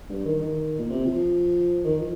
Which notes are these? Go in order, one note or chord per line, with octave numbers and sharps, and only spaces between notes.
G2
D#3
D#3
A#2
C3
F3
D#3
F3